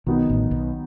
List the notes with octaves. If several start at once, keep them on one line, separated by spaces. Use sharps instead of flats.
B1 B2 D#3 F#3 B3 D#4
A1 A2
B1 B2